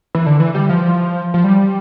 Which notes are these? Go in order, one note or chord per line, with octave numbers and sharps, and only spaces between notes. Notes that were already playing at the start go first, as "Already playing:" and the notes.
E3
D3
E3
G3
F3
F3
G3